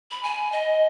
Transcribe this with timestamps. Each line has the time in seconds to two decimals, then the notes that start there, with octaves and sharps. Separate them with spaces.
0.11 B5
0.23 G#5
0.52 D#5